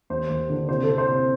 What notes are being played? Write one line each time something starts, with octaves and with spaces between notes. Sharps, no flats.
D#2 C5
D#2
D3
C3 C5
C3 A4
C5
C3